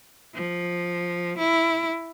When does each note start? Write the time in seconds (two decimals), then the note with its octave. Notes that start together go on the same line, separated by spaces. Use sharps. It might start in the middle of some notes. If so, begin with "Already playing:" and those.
0.35 F3
1.38 E4